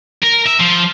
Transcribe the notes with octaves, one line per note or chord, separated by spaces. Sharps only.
A#4
E5
F3